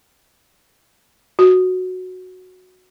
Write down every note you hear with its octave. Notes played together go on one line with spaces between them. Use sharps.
F#4